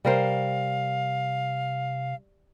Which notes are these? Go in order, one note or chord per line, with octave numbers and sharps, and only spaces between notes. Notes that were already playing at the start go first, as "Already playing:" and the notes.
C3 G3 A#4 C5 F5